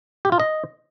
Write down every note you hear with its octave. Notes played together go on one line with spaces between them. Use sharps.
G4
F4
D#5